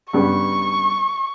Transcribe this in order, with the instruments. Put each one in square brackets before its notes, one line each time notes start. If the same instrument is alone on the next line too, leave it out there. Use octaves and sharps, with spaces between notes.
[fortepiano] G2 C#3 B3 [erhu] C#6